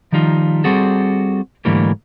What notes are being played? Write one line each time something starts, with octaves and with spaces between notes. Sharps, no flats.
D#3 F3 G3 D#4 F4
G3 C4 F#4 G#4 A4
G#2 D3 E3 G3 A3 A#3